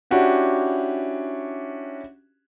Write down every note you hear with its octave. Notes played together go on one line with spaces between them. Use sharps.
C#4 D4 E4 F#4 G4 F#5